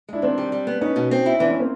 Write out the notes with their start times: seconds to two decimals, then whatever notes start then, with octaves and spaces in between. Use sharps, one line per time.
0.09 G#3 D4 E4
0.22 D#3 C4 D4
0.38 G3
0.52 G3
0.67 B3
0.81 B3 C#4 D#4
0.96 B2
1.11 C4
1.26 E4
1.40 E3 C4 D4
1.50 B3 C#4
1.60 A#3 C4